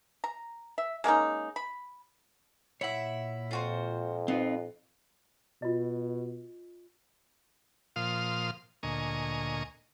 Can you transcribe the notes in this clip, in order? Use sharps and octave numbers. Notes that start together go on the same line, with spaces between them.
A#5
E5
G#3 A#3 C#4 D#4
B5
A#2 E4 C#5 E5 F#5
F2 F4 F#4 C5
B3 C4 D#4 F4
B2 F4 D#5
A#2 F3 F5 C6 D#6 F6
D2 A#2 D#5 G#5 A#5 C#6